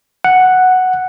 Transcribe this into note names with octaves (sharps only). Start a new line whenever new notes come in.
F#5